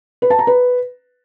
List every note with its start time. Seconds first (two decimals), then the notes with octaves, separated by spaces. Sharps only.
0.22 B4
0.30 A5
0.39 A#5
0.47 B4